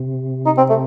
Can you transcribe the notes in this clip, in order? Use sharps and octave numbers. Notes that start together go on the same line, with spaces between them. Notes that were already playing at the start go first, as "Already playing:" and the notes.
Already playing: C3
D#4
C4
A3